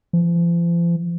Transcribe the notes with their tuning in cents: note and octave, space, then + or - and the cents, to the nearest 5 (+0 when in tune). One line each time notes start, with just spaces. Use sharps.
F3 -40